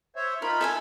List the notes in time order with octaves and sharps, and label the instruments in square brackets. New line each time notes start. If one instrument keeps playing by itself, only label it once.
[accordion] C5 C#5 E5
[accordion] D#4 F4 B5 [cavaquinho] A#4
[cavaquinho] A4 E5 G#5